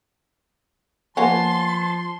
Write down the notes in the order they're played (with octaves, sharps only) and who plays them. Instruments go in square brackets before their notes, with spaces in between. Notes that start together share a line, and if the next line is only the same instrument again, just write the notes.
[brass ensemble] F3 A5 [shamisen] A#3 B3 C#4 [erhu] C6